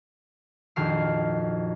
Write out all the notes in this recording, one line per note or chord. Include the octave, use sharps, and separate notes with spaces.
A#1 F2 D#3 F#4 F6 C7